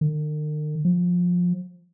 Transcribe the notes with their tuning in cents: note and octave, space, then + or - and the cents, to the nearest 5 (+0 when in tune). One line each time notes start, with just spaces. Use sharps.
D#3 -45
F3 +20